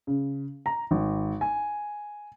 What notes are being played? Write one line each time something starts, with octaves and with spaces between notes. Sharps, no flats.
C#3
A#5
G#1
G#5